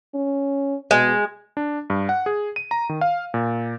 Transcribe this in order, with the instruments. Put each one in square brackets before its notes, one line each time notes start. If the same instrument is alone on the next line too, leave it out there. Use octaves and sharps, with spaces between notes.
[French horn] C#4
[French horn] B2 [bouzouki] G#3
[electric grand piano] D4
G2
F#5
G#4
D#7
A#5
D#3
F5
A#2